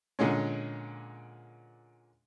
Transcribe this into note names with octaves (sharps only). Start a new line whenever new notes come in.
A#2 D3 G#3 C#4